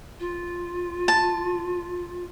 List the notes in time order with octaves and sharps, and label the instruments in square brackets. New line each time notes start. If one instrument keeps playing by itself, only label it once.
[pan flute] F4
[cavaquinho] A5